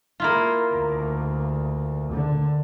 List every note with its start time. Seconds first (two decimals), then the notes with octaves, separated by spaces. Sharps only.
0.20 A#3 E4 F4
0.74 D2
2.13 D3